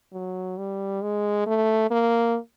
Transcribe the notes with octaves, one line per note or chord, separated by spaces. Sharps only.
F#3
G3
G#3
A3
A#3